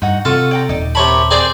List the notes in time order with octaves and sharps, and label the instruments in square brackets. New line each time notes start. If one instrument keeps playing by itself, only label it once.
[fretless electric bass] G2 [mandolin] D#4 F#4 F#5
[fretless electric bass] C3 [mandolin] F4 F#4 [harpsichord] A4
[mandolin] D5 G5 A#5
[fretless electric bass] D#1 [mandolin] D#4 D5
[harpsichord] C3 C#5 B5 [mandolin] A#4 A5
[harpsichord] C4 G#4 D5 [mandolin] A#4 B5 G6